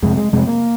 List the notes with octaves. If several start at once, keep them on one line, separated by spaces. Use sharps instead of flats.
F2 C3 G#3
G#3
F2 C3 G#3
A#3